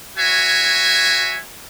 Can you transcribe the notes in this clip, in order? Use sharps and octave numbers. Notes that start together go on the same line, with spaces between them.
F#4 C#5 E5 G#5